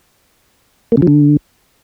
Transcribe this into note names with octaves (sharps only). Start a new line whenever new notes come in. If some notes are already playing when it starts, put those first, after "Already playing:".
A#3
C#3
F3
D3